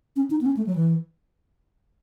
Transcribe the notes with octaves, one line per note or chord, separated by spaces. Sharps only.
C#4
D#4
B3
C#4
A3
F#3
E3